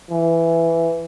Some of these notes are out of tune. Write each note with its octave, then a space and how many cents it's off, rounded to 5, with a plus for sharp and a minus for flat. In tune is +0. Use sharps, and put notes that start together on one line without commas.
E3 +10